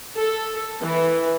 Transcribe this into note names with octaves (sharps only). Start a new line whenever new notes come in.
A4
E3